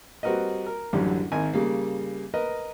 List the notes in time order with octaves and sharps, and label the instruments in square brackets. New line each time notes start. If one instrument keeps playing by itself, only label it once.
[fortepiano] G3 C4 F#4 A#4 B4 D#5
A#4
A1 F#2 D3 F#3 G3
G#1 A#4 G#5
C#3 G3 A#3
A#4 B4 D#5